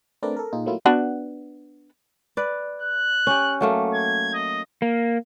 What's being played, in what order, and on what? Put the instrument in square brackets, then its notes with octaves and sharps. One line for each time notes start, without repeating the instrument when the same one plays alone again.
[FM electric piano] A3 C4 D4 A#4 B4 D5
A4 A#4
A#2 D#4 F4 G#4
F#3 A3 A#3 E4 F4
[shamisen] B3 D4 F#4
[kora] B4 D5
[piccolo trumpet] F#6
[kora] C#4 G4
F#3 A3 A#3
[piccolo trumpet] G#6
D#5
[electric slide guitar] A#3